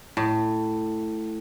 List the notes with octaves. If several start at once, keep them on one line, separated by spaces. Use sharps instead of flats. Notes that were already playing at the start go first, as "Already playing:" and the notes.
A2